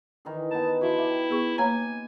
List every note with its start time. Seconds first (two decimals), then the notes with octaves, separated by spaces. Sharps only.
0.25 D#3 E3 G#4
0.51 B3 D#4 A5
0.81 F3 E4 F#4 E5
0.98 G4 E5
1.29 B3 G#4 C#6
1.58 A#3 C#5 G#5 A#5